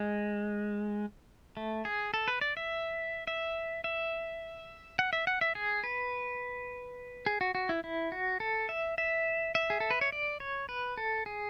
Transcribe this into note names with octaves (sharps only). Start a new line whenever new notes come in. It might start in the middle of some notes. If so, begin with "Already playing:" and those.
Already playing: G#3
A3
G#4
A4
B4
D5
E5
E5
E5
F#5
E5
F#5
E5
G#4
B4
G#4
F#4
F#4
E4
E4
F#4
A4
E5
E5
E5
G#4
A4
B4
C#5
D5
C#5
B4
A4
G#4